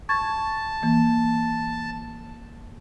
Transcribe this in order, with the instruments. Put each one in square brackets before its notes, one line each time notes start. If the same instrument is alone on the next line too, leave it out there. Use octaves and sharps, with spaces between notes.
[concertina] A5 [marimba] C#6 G#6 A6
[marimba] E3 A#3